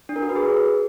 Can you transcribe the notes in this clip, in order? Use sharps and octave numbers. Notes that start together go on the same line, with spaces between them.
D4
A#4
F#4
B4
G#4